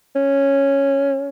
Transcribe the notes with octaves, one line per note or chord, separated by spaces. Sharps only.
C#4